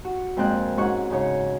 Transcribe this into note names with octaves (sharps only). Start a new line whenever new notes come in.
F#4
F2 A#2 G#3 C4 G5 F#6
G#2 C#4 E4 F#4 C#6 F#6
G#2 C#3 C#5